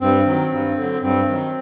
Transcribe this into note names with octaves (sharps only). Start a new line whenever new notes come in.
G2 C4
D#3 F#3
G2
D3 F#3
G2 C4
D#3 F#3